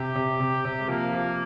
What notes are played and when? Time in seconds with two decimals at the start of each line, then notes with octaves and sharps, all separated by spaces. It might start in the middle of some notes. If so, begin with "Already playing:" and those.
Already playing: C3 G4
0.15 C3
0.40 C3
0.65 C3
0.80 G#3
0.88 F3 A#3
1.13 F3